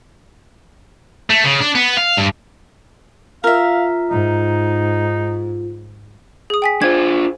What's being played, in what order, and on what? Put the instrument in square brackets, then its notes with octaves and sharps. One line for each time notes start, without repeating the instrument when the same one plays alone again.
[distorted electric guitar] A3
C#3
D4
B3
F5
G2
[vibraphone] F4 [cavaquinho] A#4 E5 [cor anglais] F5
[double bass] G#2 [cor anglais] D#4
[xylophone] G#4 D#6
G5 G#5 B6
[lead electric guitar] D4 F4 [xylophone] C5 G#6